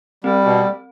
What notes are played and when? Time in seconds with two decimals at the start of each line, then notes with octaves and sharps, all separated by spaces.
0.24 G3 C4
0.44 B2